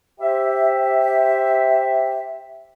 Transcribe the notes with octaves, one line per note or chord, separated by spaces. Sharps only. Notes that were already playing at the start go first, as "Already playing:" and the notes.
G4 C5 E5